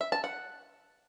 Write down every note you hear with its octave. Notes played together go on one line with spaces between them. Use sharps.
E5
A5
F#5